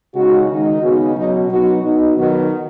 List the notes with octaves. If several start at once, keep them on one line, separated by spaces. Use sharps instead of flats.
C#3 G#3 D#4 F#4
D#3 G#3 D#4
C#3 B3 D#4 F#4
B2 F#3 C#4 D#4
F#3 B3 D#4 F#4
B2 B3 D#4
D#3 F#3 B3 F#4